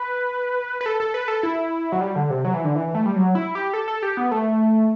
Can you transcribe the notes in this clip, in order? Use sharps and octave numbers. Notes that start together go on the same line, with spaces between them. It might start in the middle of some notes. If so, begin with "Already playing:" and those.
Already playing: B4
B4
A4
A4
B4
A4
E4
F#3
G3
D3
C3
F#3
E3
D3
E3
A3
G3
F#3
E4
G4
A4
A4
G4
B3
A3